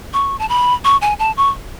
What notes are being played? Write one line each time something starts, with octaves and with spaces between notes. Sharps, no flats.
C#6
A5
B5
C#6
G#5
A5
C#6